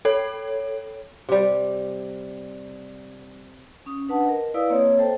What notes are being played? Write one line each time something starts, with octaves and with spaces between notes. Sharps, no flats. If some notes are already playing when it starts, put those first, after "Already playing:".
A4 C#5
C3 G3
C#4 D#6
D4 B4 F#5 A5
A#4 D#5
E4 B4 D5 F5 D#6 E6
A#3 C4 C#5 D#5 E5
A4 C5 G5 A5